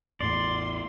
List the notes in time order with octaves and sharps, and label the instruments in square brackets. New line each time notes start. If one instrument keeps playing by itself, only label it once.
[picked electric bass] A1 E2 A2 [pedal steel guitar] D5 [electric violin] C6